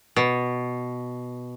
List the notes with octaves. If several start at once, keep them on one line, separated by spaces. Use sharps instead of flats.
B2